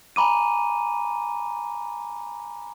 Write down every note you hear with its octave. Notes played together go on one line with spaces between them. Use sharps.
G#5 A#5 B5 D6 D#7